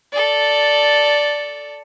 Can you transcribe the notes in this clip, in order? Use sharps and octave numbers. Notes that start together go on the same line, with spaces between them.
A4 D5